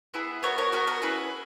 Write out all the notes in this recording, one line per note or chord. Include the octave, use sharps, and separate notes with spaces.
B3 E4 G#4
B3 F#4 A#4 C#5
A#4 C#5
B3 F#4 A#4
A#4
C#4 E4 G#4 B4